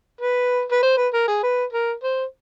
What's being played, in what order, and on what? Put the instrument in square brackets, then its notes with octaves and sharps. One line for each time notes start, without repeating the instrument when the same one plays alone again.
[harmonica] B4
B4
C5
B4
A#4
G#4
B4
A#4
C5